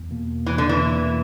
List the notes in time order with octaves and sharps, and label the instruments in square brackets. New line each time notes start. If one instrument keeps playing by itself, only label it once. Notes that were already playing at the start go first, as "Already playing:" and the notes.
Already playing: [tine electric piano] E2
B2 A#3
[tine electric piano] E2 [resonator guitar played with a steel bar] E3
[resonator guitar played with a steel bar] D3
E3
[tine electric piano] B2 A#3